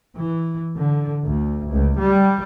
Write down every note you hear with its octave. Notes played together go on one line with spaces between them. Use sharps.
E3
D3
D2
C#2
G3